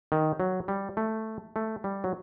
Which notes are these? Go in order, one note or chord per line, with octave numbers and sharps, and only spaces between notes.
D#3
F#3
G3
A3
A3
G3
F#3